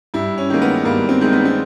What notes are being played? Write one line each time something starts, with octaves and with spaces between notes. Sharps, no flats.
G2 E4
C#4
D#3 G#3 A#3
B3
G2 A#3
C4
D#3 G#3
B3
C4